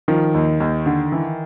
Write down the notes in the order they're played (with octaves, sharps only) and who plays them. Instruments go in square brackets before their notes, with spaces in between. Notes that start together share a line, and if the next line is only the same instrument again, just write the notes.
[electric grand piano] D#3 [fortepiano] F3
[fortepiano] D#2
D#2
D3
E3